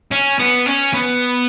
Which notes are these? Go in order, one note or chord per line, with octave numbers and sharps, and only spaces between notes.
C#4
B3
C#4
B3